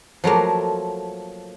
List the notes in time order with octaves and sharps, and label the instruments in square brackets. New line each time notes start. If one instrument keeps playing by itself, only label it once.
[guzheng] F3 F#3 A3 A#3